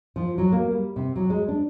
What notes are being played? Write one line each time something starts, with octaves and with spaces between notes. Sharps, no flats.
F3
F#3
A#3
G3
C3
F#3
G#3
D4